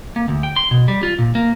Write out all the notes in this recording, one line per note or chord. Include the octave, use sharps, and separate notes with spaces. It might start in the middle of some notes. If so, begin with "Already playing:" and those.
A#3
D2
G5
C6
B2
G3
F4
A#2
A#3